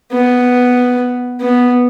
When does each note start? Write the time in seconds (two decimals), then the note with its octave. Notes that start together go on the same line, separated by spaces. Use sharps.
0.12 B3
1.41 B3